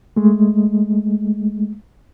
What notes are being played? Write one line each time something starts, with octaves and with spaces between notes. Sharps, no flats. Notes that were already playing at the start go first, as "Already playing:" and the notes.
G#3 A3